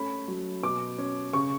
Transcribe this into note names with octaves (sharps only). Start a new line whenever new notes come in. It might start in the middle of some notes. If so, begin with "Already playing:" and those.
Already playing: A3 C#4 B5
F#3
B2 D6
C#4
C#3 C#6